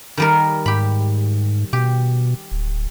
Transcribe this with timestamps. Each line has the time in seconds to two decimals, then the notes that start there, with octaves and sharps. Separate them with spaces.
0.17 D#3 G3 A#4
0.66 G#2 G4 B5
1.73 B2 G4
2.52 D1